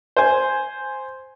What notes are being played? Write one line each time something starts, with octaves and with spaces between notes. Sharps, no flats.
C5 G#5